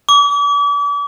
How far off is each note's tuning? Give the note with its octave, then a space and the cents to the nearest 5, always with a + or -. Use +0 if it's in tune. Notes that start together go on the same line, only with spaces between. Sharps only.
D6 -40